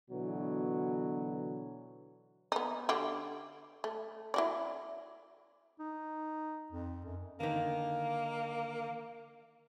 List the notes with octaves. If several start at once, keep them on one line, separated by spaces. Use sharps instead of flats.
B2 D3 E3 F#3
B3 D#4
D3 F#4 G4
A3
E4 F#4 D5
D#4
F2
F#2
D3 D#3 A#3